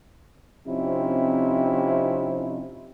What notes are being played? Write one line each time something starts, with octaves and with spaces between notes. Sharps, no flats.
C3 F3 C4 C#4 D#4 E4